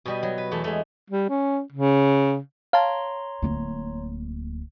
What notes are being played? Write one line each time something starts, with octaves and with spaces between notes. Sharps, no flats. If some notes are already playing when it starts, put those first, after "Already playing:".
B2 G3 D#5
F#3
B4
E2 A3 A4
G#3 A3
G3
C#4
C#3
C#5 F5 A5 A#5 C6
D1 A#3